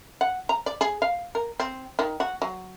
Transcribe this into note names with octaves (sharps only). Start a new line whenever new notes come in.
F#5
A#5
D5
G#4
F5
A#4
C4
D#3
F#4
F#3